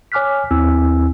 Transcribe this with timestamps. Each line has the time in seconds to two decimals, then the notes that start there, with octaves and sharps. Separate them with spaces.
0.12 C#5 G#5 D6 F6 F#6 B6
0.51 D#2 C4 E4 G#5 E6